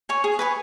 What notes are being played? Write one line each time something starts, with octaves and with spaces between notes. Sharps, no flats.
C#5 G#5 C#6
G#4
B4 G#5 C#6